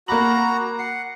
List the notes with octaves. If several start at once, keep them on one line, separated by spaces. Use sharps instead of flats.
A#3 F#4 A#5 B5 D6 F#6 F#7
F#5 C7